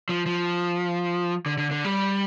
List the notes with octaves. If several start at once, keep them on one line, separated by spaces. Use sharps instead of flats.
F3
F3
D3
D3
D3
G3